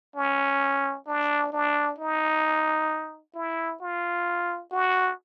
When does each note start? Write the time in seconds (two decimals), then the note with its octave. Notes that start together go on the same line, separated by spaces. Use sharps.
0.16 C#4
1.07 D4
1.52 D4
1.99 D#4
3.35 E4
3.81 F4
4.71 F#4